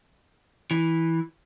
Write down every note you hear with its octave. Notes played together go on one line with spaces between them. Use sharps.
E3